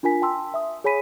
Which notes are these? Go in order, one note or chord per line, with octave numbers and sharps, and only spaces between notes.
D4 F4 A#4 G#5 B6
G5 A5 C6 E6
E5 D#6
G#4 C#5 G#5 B5 B6 D#7